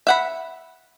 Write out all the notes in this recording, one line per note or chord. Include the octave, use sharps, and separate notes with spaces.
E5 F#5 B5